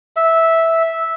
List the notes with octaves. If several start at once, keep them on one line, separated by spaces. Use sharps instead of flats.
E5